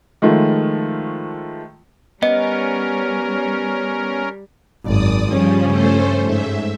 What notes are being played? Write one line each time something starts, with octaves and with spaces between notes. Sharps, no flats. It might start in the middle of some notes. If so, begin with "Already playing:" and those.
D#3 F3 G#3 A3 F4
G3 B3 C#4 A#4 D#5
G#1 F#2 D5 D#6
G2 C#3 F3 G3 C#4
A3 A4 C5
G#2 E5